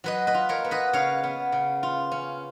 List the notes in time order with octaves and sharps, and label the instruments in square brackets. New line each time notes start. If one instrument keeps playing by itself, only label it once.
[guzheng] F#3 B4 D#5
B4 D#5
F4
A#4 C#5
B3
B4 D#5
C#3 C#5 F5
B3
C#3
F4
C#4